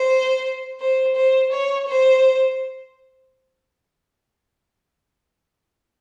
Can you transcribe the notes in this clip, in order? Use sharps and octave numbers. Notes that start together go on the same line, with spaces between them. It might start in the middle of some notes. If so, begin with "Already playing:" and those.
Already playing: C5
C5
C5
C#5
C5